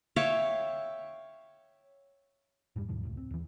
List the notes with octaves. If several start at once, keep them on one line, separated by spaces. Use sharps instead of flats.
C#5 E5 F5 G5
F2 G#2 G3
D#2 G#2 C3 F3
F1 C#2 A2
C4
D#2 E3